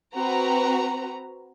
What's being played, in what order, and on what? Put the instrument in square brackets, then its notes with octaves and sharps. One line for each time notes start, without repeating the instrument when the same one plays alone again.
[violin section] C4 F#4 B4 A#5